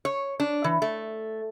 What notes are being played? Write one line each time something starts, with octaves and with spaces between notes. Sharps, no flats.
C#5
D4
E3
A3